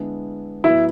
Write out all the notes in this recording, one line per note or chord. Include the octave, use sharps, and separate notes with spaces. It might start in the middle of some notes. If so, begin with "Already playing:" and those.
Already playing: D3 G#3 B3 E4
A2 F#3 B3 E4